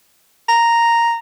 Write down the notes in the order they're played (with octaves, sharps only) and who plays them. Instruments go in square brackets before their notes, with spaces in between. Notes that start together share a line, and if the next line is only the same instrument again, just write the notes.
[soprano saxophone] A#5